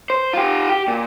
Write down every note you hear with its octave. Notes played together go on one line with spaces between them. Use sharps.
C5
F4 G4
G4
A#2